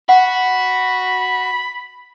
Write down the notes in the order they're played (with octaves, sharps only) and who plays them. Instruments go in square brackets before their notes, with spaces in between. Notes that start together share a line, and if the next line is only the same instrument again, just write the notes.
[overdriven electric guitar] F#4 [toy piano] F#5 [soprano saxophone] B5